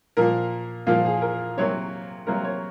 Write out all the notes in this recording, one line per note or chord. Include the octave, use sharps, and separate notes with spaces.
A#2 F3 A#3 A#4
A#2 F3 A#3 F4
G#4
A#4
C3 F#3 A#3 C#5
C3 F#3 A#3 A#4
C#5